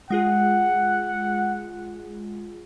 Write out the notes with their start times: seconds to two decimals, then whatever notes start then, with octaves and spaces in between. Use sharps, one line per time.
0.10 G#3 F4 G#4 F#5